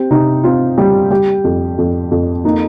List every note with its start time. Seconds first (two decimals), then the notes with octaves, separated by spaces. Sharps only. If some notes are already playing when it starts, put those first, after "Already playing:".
Already playing: C4 G4
0.10 C3 D#4
0.44 C4 F4
0.78 G3 G4
1.10 G3 G4
1.44 F2
1.78 F2
2.11 F2
2.44 A#3 D#4